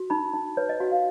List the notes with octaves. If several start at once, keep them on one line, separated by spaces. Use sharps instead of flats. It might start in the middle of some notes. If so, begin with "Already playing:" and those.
Already playing: F#4
D#4 B5
D#4
B4 C#5
D#5
F#4 F#5
F5